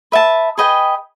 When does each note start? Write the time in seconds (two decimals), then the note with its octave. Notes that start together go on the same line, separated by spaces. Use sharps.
0.12 B4 E5 A5
0.58 G#4 B4 D#5 G5